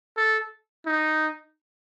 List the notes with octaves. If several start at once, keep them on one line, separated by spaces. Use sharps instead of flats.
A4
D#4